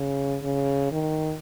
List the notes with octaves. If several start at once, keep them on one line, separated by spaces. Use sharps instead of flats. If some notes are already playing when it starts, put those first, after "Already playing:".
Already playing: C#3
C#3
D#3